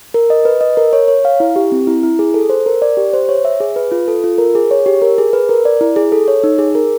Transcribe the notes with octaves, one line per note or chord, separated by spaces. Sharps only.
A#4
D#5
B4
D#5
A#4
C#5
C#5
F5
E4
G4
C4
E4
E4
G#4
A4
C5
A#4
D5
G4
C5
C#5
E5
G#4
B4
F4
A4
F4
A#4
G#4
C#5
G4
A#4
G#4
B4
A#4
D5
E4
G#4
A4
C#5
D#4
G#4
A#4